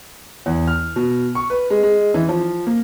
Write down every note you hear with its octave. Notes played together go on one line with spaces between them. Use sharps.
E2
F6
B2
C#6
B4
G#3
G#3
E3
F3
A#3